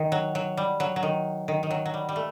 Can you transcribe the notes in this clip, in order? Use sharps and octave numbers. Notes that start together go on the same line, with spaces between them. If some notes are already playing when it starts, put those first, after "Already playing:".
Already playing: D#3
F#3
F#3
G3
F#3
F#3
D#3
D#3
D#3
F#3
F#3
G3
G3
A3